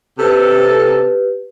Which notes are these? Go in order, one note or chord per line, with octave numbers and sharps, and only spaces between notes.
C3 G4 A4 B4